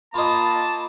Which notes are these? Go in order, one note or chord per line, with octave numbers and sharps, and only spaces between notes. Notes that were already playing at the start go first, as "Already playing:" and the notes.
A#3 F4 D#5 A5 B5